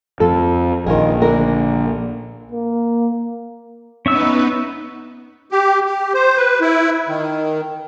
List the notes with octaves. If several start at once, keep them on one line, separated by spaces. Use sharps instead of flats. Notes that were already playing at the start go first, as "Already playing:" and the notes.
F2 A4
A#1 D#3 F4 G#4
D3 A#4
A#3
B3 C#4 D#4 B4 E5 E6
G4
G4
C5
B4
E4
D#3